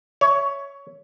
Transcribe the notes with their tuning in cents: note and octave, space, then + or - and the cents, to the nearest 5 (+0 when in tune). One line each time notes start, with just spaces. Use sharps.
C#5 +15 E5 +0